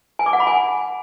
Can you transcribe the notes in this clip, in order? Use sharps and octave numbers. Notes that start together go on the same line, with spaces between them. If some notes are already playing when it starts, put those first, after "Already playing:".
G#5
D6
F#5
B5
G#5